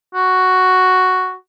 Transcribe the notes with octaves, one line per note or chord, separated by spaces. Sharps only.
F#4